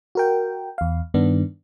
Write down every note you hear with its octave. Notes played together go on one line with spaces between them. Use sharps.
F#4 A#4 G5
E2 F5
G2 D#3 B3 D4